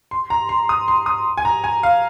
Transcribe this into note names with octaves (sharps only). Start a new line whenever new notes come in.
C6
A#5
C6
D#6
C6
D#6
G#5
A#5
G#5
F5